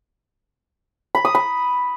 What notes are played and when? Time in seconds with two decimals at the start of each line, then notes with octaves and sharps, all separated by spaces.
1.15 B5
1.25 D#6
1.35 B5